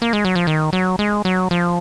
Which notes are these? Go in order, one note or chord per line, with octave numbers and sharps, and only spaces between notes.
A#3
G#3
F#3
F3
D#3
F#3
G#3
F#3
F3